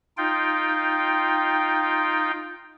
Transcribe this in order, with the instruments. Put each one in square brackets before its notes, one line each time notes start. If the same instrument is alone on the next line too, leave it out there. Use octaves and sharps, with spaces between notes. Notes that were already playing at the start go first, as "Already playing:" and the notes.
[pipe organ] D#4 F4 G5